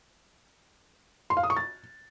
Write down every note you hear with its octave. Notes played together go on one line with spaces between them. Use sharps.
C6
F5
D#6
C#6
A6